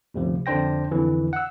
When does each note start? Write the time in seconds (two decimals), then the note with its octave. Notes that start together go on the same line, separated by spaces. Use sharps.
0.14 G1 D2 C3 F3
0.46 F2 D3 D4 C5 G5 A#6
0.91 F2 D3 E3
1.33 F#5 E6